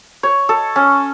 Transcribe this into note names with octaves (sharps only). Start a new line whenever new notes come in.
C#5
A4
C#4